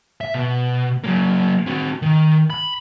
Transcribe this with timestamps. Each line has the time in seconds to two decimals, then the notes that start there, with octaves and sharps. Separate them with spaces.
0.21 E5
0.34 B2
1.04 F#3 A#3
1.66 C4 F#4
2.02 D#3
2.50 B5